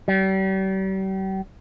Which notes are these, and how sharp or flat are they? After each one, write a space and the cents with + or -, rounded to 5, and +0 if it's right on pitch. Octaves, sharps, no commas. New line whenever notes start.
G3 -40